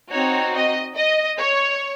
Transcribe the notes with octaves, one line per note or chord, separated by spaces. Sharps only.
C4 D#4 F#4 C#5
D#5
D#5
C#5